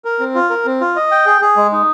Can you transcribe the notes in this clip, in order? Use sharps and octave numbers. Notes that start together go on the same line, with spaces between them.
A#4
C4
F4
A#4
C4
F4
D#5
G5
G#4
G#4
G#3
D#4